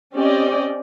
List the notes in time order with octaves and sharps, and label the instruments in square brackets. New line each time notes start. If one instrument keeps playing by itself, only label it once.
[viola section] C4 C#4 G4 D5 D#5